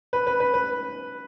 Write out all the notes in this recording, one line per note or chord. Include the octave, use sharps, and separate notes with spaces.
B4
B4
B4
B4